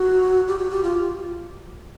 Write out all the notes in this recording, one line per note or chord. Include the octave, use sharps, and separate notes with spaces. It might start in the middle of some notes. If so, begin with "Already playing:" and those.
Already playing: F#4
G4
F#4
G4
F4